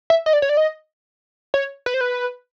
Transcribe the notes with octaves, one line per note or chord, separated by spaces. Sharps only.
E5
D#5
D5
C#5
D5
D#5
C#5
B4
C5
B4